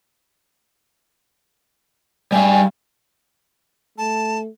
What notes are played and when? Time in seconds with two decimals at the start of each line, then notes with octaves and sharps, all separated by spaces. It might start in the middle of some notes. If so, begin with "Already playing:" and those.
2.32 G3 F5 G#5
3.98 A3 A5